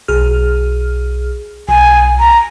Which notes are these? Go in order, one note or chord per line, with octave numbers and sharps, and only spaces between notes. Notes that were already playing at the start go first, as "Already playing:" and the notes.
B1 G#4 F6
B1 G#5
A#5